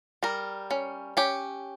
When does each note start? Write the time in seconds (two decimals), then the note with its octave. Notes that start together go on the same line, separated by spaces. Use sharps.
0.23 G3 A#4
0.71 C#4
1.17 C#4 G4